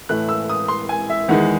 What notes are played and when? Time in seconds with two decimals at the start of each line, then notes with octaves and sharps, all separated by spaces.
0.09 A2 E3 A3 F#6
0.29 E6
0.49 D#6
0.68 C6
0.89 G#5
1.10 E5
1.29 E2 D#3 G#3 F#5